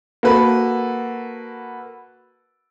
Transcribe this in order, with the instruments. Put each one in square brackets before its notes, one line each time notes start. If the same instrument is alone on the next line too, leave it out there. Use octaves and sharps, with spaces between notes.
[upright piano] A#3 F#4 A4 B4